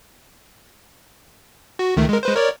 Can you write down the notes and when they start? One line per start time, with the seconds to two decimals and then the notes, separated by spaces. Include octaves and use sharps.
1.79 F#4
1.97 C#2 D#3 A3
2.09 G#3 A#4
2.23 G#3 B4 C5
2.35 A#4 C#5 D5